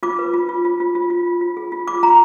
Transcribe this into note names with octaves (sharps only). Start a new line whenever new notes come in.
F4 D6
B4
F4
F4
F4
F4
F4
F4
F4
F4
G#4
F4
F4 D6
F4 A#5